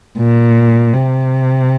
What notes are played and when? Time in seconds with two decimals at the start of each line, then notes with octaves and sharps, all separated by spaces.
0.19 A#2
0.94 C3